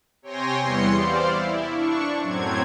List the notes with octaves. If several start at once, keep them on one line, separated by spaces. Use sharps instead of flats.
C3 C#5 G5 G#5 C6 A#6
E2 E3 G3 B3 C6 C#7
C5 D5 F5
E4
D4 C#6
F#2 A2 F#3 C4 G#6